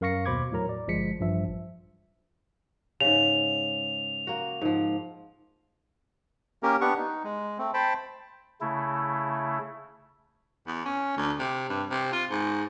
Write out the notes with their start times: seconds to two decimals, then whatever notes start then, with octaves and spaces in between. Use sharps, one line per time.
0.01 F#2 A#4 F5 C#6 A#6 C#7
0.26 D#2 B2 C5 B5 D6 G#6
0.51 E2 A2 F#3 A#4 A#5
0.69 D5
0.88 G1 F3 G#3 B6 C#7
1.19 A1 G2 F3 E5
3.00 G#2 C#3 F7
4.27 A#3 F#4
4.61 G#2 F3
6.63 A#3 C#4 G4 A#4
6.81 B3 D4 G4 F#5 C#6
6.97 D#4
7.24 G#3
7.58 A3 C4
7.74 C5 G5 A5 B5
8.61 C#3 A3 E4
10.67 E2
10.85 C#4
11.17 D2
11.39 C3
11.69 G2
11.90 C3
12.12 F4
12.30 G#2